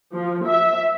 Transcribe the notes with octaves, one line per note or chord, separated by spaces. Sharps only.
F3
E5